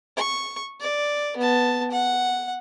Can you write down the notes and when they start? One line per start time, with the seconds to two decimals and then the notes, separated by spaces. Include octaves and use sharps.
0.16 C#6
0.80 D5
1.37 B3 A5
1.91 F#5